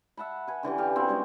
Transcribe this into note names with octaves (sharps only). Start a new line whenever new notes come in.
E5 F#5 A5 B5
B4 G#5
D3 E3 C#4 G4
G4 F5 G#5
B3 C4 E4 F#4
G3 G#3 C#4